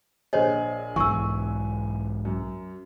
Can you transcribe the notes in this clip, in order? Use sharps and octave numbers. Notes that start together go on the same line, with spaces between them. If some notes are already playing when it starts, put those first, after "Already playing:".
A#1 G#4 C5 C#5 D#5
B1 G#2 E3 G#5 C#6 E6
F#2